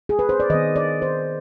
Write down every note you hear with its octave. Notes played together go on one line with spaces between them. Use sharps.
G#4
B4
C5
D5
D#3 B3 D#5
D5
C5